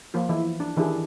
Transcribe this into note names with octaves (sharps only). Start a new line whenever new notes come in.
F3 A#3 F4
E3 E4
D4
D#3 E3 D4 E4 G4 G#4